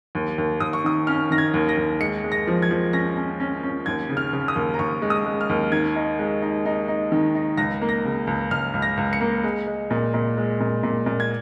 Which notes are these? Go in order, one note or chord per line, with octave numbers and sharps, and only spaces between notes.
D#2
D#2
D#2 D#6
C#6
D#3 D#6
C#4 F6
D#3 A#6
G#6
D#2
A#6
D#2
G#3 C#7
G#3
A#6
F3
G#6
F3
C#4 A#6
C#4
C#4
C#4
D#2 G#6
C#3
F6
C#3
D#6
D#2
A#5
D#2 C#6
G#3
D#6
G#3
F6
D#2
D#3 G#6
D#4
G#3
D#4
D#4
D#4
D#3
D#4
C#2 A#6
A#3
A#6
C#3
C#2
C#2 F6
C#2
A#6
C#2
C#7
A#3
G#3
G#3
A#2
A#2
G#3
A#2
A#2
A#2
G#6